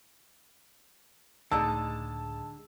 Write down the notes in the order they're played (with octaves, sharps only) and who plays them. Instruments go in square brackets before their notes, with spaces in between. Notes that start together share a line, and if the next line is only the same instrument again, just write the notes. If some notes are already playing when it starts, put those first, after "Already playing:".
[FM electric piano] C#2 A2 [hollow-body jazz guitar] D3 G#3 D#4 [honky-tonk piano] A5 [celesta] E6